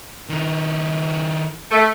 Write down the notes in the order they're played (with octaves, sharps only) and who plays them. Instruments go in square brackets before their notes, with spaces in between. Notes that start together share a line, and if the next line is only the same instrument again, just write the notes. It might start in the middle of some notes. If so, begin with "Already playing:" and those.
[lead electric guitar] D#3 E4
[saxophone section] A3